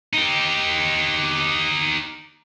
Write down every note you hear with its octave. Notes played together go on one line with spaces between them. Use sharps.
D#4 G4